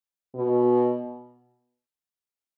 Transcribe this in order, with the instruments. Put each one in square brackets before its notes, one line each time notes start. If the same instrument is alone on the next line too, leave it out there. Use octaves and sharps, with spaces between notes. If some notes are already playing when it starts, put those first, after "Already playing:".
[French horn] B2